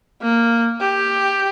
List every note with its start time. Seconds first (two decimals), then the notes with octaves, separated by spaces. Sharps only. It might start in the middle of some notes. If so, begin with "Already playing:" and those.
0.21 A#3
0.80 G4